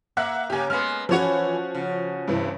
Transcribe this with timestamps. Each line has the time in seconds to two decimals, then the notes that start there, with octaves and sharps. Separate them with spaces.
0.17 A#3 E5 F#5 F#6
0.50 C#3 A#3 G4 G#5
0.70 G#3 A#3 B3 F6
1.09 E3 F3 C#4 F#4 C#5
1.75 C#3
2.28 G2 C3 E3